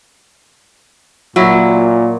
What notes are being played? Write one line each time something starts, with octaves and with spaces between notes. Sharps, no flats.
A#2 F#3 E4